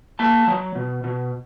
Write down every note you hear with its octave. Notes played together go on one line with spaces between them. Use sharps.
A#3 A5
F#3
B2
B2